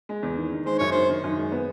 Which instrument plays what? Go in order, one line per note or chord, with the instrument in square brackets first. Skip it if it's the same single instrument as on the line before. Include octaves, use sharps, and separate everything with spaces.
[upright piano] G#3
E2
D#3
D#3
[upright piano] G#3 [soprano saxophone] C5
[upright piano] F#2 [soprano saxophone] C#5
[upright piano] D#3 [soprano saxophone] C5
[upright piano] D#3
F#2
G#3
B3